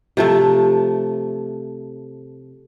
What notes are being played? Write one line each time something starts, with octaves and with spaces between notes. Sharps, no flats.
C3 F3 A3